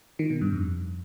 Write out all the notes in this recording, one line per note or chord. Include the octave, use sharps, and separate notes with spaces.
D#3
B2
G2
F2